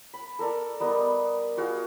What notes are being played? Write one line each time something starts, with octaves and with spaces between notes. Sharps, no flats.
B5
A4 A#4 D5 A#5
G3 B3 A#4 D#5
F4 F#4 G#4 F5